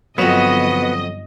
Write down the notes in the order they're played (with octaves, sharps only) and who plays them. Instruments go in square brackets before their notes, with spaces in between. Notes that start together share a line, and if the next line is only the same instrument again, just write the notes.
[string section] G1 [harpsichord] F2 F#3 [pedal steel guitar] B3 F#4 B4 [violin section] D#5